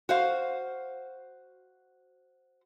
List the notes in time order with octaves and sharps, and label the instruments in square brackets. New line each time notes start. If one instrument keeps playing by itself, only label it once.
[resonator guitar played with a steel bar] F#4 C5 F5